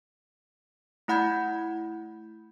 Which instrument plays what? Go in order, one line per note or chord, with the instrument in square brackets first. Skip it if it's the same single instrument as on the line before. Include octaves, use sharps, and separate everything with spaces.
[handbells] A3 E4 F#5 B5 G6 G#6